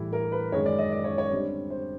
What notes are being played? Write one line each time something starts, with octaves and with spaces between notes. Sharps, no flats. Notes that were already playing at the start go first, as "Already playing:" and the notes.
Already playing: A2 E3 G3 E4
A#4
B4
F#2 D#3 G#3 C#4 C#5
D5
D#5
D5
C#5
C#5
D3 G3 C4
C5